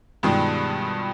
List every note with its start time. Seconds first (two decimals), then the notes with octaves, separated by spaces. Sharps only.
0.23 G2 B2 D#3 F3 G3 G#3